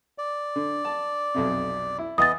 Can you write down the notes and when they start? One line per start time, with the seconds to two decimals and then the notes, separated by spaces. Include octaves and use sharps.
0.18 D5
0.56 D3
0.85 A5
1.34 B1 F2 C3
1.99 E4
2.18 E3 B3 D#5 D#6 A6